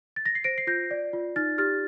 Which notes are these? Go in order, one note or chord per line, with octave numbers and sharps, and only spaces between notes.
A6
A#6
C7
C5 A#6 D7
C7
F4 G6 A#6
D5
F4
D#4 F6 A6
G4 F6 A6